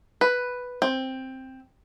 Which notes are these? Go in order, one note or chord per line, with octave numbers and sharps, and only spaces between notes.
B4
C4